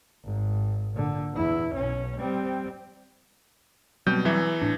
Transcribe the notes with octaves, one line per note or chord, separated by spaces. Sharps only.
G#1
A#2 D3
E2 E4
B1 C#4
G3 C4
B2 F#3 G3 C4 G6
E2 E3 E5
A2 D4